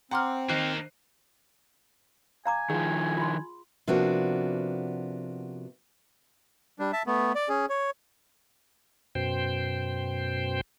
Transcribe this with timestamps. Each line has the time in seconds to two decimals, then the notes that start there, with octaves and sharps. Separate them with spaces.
0.11 C4 F#5 G5 A#5 C6 D6 F6
0.49 D#3 A#3 D#4 C5 F#6 C7
2.46 F5 G#5 A#5 D6
2.70 D#3 F3 G#4
3.18 F4 C6
3.87 C3 F3 A#3 B3 D4 F#4
6.79 G3 D4
6.93 E5 A5
7.07 A3 B3
7.35 D5
7.49 C#4 G#4
7.69 C#5
9.15 F#2 B2 C5 G5